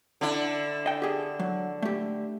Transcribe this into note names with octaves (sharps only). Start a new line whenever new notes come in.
D3 E4
D#5 G5
G4 G#4
F#3
A3 G4